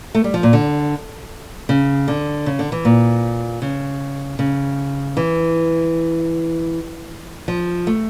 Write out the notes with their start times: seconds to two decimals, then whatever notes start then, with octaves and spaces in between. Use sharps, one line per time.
0.15 A3
0.24 G3
0.34 F3
0.43 A#2
0.53 D3
1.69 C#3
2.08 D3
2.46 C#3
2.59 D3
2.72 E3
2.85 A#2
3.62 C#3
4.39 C#3
5.17 E3
7.48 F3
7.87 A3